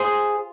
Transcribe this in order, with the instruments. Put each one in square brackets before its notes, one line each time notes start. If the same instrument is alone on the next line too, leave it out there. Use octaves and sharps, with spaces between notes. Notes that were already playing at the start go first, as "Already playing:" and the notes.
Already playing: [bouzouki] F4 [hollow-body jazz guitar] G#4 C5